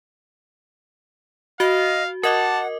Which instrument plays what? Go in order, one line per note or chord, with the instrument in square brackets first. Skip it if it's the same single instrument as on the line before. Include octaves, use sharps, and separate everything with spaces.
[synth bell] F#4 [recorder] D#5 [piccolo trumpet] F5
[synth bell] A#4 D#5 D6 [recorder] F#5 [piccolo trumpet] A5